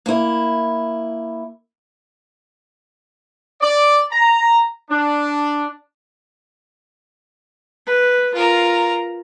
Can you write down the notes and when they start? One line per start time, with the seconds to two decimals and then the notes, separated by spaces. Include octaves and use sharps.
0.06 A#3 E4
3.60 D5
4.10 A#5
4.90 D4
7.86 B4
8.34 F4 A#4 A#5